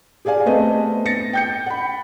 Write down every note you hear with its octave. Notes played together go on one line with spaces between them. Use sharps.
G4 G#4 D5 F5 G#5
A3 B3 C4 A4 B4 D#5
A6 A#6 C#7
G5 G6 C#7
F#5 B5